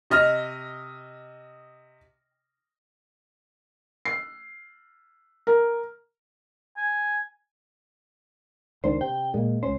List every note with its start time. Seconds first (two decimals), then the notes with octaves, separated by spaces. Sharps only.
0.10 C3 D#5 F6 A#6
4.05 C7
5.47 A#4
6.77 G#5
8.84 C#2 D#3 D4 C5
9.01 C3 G5
9.34 A#2 G#3 A#3
9.63 C#2 C#4 C5